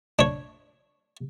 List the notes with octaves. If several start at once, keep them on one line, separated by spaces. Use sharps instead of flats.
D4 C#5